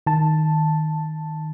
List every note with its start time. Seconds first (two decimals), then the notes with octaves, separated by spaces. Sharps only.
0.06 D#3 A5